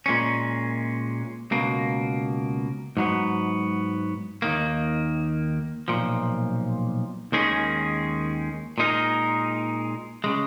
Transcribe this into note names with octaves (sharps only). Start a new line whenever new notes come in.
A#2 G#3 C#4
C#2 B2 A#3
G#2 F#3 B3
D#2 D#3 A#3
B1 A#2 F3
D#2 D#3 G#3 C#4 G#4
A#2 G#3 D#4 A#4
C#3 G#3